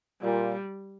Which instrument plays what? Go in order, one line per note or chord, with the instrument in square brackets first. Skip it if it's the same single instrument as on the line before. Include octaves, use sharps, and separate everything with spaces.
[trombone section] A#2 [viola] G3